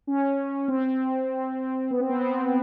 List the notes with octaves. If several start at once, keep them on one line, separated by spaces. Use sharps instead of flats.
C#4
C4
B3
C4
B3
C4